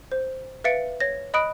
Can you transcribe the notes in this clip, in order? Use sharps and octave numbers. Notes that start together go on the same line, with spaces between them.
C5
B4 E5 F5 A6 C#7 D7
C#5 A#6
D#5 B5 D#6 F#6 D7